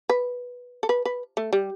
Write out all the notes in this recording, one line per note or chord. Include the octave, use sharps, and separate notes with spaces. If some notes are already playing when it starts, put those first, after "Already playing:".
B4
A4
B4
B4
A3
G3